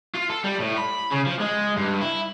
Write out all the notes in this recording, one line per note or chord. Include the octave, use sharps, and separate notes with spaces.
F4
A4
G3
A2
B5
C#3
F3
G#3
G2
E4